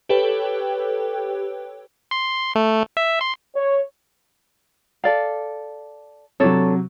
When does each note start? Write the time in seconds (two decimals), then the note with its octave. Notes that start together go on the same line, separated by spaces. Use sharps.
0.09 G4 A4 B4 C#5 G5
2.11 C6
2.55 A3
2.97 E5
3.21 C6
3.56 C#5
5.04 A4 D5 F5
6.40 C3 F#3 D4 A4 C#5